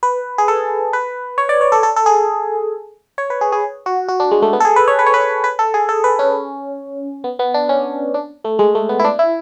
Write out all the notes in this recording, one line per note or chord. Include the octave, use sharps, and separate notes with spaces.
B4
G#4
A4
B4
C#5
D5
C#5
A4
A4
A4
G#4
C#5
B4
G#4
G#4
F#4
F#4
D4
G#3
A3
B3
A4
G#4
B4
C#5
B4
C#5
B4
B4
A4
G#4
A4
B4
C#4
B3
B3
D4
C#4
D4
A3
G#3
A3
B3
E4
D4
E4